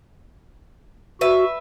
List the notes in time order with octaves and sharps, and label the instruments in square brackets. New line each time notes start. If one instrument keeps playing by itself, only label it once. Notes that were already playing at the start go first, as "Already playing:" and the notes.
[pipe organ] F#4 [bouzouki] B4 E5